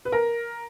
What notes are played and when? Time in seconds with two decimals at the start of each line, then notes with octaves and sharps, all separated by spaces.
0.05 B4
0.12 A#4